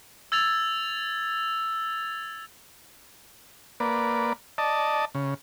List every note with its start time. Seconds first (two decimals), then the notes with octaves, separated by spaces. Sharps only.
0.32 E6 G#6 A6 F7
3.80 A#3 B4 D5
4.58 D5 D#5 A5
5.15 C#3